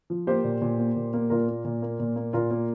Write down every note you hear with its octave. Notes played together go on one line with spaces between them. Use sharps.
F3
A#3 G4 C5
A#2
A#2
A#3
A#2
A#3
A#2 F4 A#4
A#3
A#2
A#3
A#2
A#3
A#2 F4 A#4
A#3